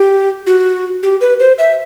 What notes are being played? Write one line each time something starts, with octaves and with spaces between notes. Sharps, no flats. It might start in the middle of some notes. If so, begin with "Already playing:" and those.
Already playing: G4
F#4
G4
B4
C5
E5